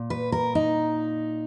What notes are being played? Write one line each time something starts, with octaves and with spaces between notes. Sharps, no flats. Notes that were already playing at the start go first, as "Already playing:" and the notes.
Already playing: A#2
B4
A#4
D#4